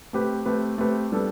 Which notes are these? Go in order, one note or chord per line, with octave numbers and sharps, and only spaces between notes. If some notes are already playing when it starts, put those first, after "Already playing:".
A3 C4 G4 B4
A3 C4 G4 B4
A3 C4 G4 B4
G3 B3 D4 A4